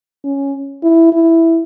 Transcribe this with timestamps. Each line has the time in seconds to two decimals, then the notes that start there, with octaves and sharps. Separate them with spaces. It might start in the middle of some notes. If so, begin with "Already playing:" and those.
0.24 C#4
0.83 E4
1.13 E4